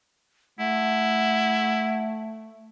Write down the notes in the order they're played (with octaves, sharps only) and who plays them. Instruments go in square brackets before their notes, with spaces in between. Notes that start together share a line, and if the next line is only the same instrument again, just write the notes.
[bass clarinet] A3 [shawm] E4 [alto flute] F#5